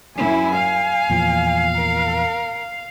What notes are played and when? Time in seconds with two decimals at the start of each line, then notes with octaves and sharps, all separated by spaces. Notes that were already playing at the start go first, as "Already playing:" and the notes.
0.17 F#2 E4 G#5
0.53 F5
1.10 E2 A#2 F3
1.75 A#4